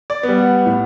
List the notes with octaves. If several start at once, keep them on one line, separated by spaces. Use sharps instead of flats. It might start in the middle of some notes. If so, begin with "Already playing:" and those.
D5
B3
G3
F#5
A2